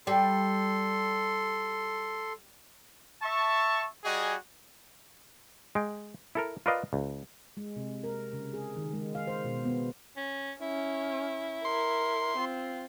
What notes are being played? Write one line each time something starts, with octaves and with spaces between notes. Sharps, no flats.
G3 A4 C6
E5 A5 C#6
G3 F#4 G#4 D#5 G#5 D#6
G#3 G5
E4 A4 A#4
F4 A#4 B4 D5 D#5 F5
C#2
G#3
C3
A#4
C#3
G#4
D#3
G#3
F5
C5
B2
B3
C#4
C#4 E4
A#4 C6
C4 F4